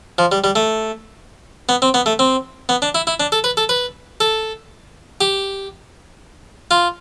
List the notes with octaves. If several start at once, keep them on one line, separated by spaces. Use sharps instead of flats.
F3
G3
G3
A3
B3
C4
B3
A3
C4
B3
D4
E4
E4
D4
A4
B4
A4
B4
A4
G4
F4